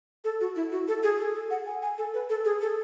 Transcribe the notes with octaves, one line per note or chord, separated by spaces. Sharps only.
A4
F#4
E4
F#4
A4
G#4
A4
A4
F#5
G#5
G#5
A4
B4
A4
G#4
A4